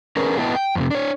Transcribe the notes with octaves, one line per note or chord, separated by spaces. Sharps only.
C#4 D4 G#4 A#4 B4
B3 E4 B4 D#5 G5 A5
G5
F2 A2 C3
D4 C#5